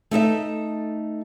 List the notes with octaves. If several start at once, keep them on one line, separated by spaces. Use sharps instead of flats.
A3 D#4 A4 E5